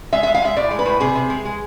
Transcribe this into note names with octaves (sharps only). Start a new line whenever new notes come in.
G#3 E5
G#3 E5
F5
G#3 E5
A2 D5
G#3
B4
A2
C3 G#4
C3
G#3
G#3